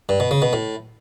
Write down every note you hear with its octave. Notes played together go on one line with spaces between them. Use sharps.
G2
B2
C#3
B2
A2